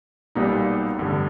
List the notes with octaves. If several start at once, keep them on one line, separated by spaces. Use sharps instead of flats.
B1 A#2 G3 B3 D#4
A1 G2 D3